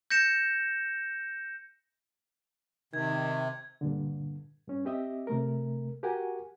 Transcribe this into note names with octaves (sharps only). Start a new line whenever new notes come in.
G6 A#6 C#7 E7
C3 D#3 G#6
G2 A#2 D3
G2 C#4
C4 G4 D#5 E5
C3 A3 A#4
F#4 G4 A#4 F#5 G#5